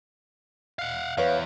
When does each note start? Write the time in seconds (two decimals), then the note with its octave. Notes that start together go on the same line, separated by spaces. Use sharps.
0.79 F5 F#5
1.17 E2 B4 C#5 F5